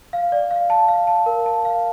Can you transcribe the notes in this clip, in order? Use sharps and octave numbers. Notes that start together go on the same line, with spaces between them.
F5
D5
F5
A5
F5
A5
A#4
A5
F5